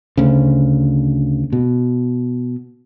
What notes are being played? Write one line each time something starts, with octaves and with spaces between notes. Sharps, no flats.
D2 C#3
B2